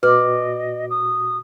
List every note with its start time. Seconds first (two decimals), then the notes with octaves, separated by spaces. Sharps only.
0.03 A#2 F#4 B4 D5 D#5
0.90 D#6